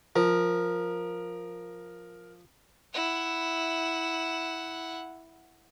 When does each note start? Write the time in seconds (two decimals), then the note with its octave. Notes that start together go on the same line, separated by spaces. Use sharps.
0.16 F3 A#4
2.93 E4 F#5